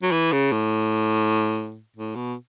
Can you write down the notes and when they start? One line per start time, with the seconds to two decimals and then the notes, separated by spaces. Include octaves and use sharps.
0.03 F#3
0.12 E3
0.32 C#3
0.52 A2
1.96 A2
2.16 B2